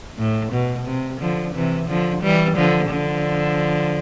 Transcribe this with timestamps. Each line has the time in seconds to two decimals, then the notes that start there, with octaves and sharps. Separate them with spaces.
0.19 A2
0.52 B2
0.87 C3
1.21 D3 F3
1.54 C3 E3
1.88 D3 F3
2.22 E3 G3
2.57 D3 F3
2.90 D3 F3